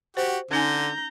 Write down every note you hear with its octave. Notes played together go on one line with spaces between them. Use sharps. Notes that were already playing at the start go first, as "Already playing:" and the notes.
F#4 G4 C5
D3 C#4 D#4 G#5 A#5 G6